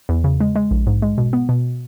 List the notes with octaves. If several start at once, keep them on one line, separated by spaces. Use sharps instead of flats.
E2
C#3
G#3
G#3
A#1
G#2
G#3
B2
B3
B2